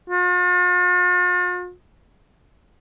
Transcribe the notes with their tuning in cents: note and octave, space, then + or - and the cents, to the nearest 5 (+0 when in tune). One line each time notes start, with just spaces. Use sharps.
F4 +45